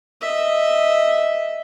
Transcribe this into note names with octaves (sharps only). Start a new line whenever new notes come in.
D#5 E5